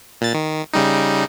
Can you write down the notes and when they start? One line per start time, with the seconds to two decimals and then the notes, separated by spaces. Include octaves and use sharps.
0.21 A#2 A6
0.34 D#3
0.74 C#3 G3 D#4